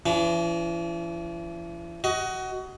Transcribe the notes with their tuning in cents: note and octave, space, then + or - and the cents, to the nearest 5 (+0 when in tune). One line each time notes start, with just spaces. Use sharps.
E3 +40 D4 -40
F#4 +20 D#5 +20